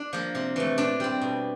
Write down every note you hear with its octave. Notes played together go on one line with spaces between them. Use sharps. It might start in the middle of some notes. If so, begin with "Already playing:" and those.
Already playing: D4
F3 A#3
C3
E3 A3
A#2 D4
G3 C4
B2